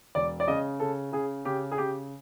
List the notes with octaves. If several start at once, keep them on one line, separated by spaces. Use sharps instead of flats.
E1 D5
D5
C#3 D#5
C#3 A4
C#3 G#4
C#3 G4
G#4
C#3 G4